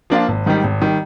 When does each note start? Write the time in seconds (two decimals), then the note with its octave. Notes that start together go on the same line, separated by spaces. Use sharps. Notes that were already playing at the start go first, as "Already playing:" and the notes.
0.10 F3 A#3 D4 F4
0.28 G#1
0.46 G#2 D#3 G3
0.64 G#1
0.82 D#3 G3